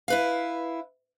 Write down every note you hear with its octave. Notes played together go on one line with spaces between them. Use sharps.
E4 B4 F5